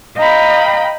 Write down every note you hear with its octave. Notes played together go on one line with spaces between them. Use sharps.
D#5 F5 G5 A#5 B5